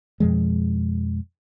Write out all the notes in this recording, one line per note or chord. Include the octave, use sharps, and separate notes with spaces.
F2 B2 F3 G#3